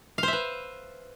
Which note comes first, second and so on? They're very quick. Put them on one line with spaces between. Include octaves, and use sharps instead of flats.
F5 C5 E5 B4